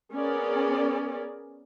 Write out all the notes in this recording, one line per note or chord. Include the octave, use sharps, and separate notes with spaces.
B3 C#4 G#4 A#4 D5